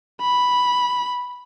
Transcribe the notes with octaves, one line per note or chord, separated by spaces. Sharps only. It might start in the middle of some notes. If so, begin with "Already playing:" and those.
B5